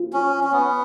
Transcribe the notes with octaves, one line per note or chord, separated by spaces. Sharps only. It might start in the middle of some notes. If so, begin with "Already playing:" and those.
Already playing: F4
C#4
C#4
B3